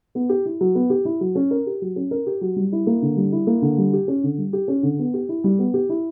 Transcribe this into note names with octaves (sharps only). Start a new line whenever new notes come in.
B3
G4
E4
F#3
B3
G4
E4
F#3
C#4
A#4
G4
F#3
C#4
A#4
G4
F#3
G3
E4
A#3
D3
G3
E4
A#3
D3
G3
G4
C#4
D3
G3
G4
C#4
D3
B3
G4
E4
G3
B3
G4
E4